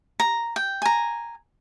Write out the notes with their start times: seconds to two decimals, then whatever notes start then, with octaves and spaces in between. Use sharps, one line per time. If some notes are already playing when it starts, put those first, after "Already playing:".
0.20 A#5
0.56 G5
0.82 G#5 A#5